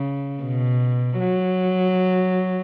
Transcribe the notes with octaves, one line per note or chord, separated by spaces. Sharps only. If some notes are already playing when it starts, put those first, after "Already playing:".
Already playing: C#3
B2
F#3